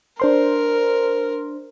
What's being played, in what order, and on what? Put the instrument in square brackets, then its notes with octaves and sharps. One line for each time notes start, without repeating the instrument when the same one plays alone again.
[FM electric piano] D4 C5 C6 [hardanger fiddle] A#4